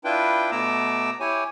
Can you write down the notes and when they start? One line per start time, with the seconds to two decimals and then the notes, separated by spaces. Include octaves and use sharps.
0.05 D4 E4 F4 B4 G5
0.51 B2 A3 B3 A#5 D6 E6
1.20 E4 G4 C#5 G#5